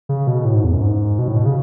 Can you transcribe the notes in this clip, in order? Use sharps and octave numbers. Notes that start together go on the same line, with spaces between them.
C#3
B2
A2
G#2
E2
F#2
G#2
B2
A2
B2
C#3